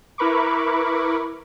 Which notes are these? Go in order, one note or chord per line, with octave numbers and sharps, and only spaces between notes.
E4 A#4 B4 B5 C#6 D6